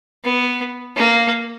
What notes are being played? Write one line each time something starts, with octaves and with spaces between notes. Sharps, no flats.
B3
A#3